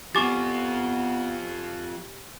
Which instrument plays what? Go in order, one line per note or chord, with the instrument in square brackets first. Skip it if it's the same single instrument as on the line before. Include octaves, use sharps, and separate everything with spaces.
[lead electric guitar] F3 C4 [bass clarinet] B3 [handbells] G4 G#5 C#6 [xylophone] D6 A6